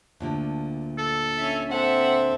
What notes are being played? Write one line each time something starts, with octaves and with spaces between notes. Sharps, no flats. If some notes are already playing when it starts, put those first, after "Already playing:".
D2 A#2 D3
A4
C#4 E5
C4 A4 E5 F#5